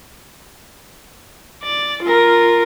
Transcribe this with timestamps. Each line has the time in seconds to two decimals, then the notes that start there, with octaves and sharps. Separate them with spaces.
1.63 D5
2.03 F4 A#4